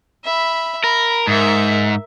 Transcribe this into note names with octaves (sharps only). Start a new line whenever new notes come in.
E5 B5
A#4 B5
G#2 A#4 E5